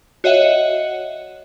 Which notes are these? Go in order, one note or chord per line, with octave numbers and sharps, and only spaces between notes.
F#4 C#5 D#5 E5 F#5